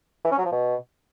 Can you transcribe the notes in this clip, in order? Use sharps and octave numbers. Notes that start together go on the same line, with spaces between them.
E3
C#4
F#3
F3
B2